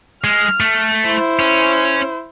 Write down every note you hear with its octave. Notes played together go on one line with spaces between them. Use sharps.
G#3 F6
A3
E4 C5
C#4